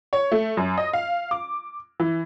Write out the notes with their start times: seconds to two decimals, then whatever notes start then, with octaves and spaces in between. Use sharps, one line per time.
0.13 C#5
0.32 A3
0.57 F#2
0.78 D#5
0.93 F5
1.31 D6
2.00 E3